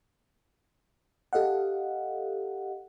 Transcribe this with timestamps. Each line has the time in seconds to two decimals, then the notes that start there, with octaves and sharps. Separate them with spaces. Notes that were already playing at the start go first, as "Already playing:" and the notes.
1.33 G4 A4 D#5 F5 F#5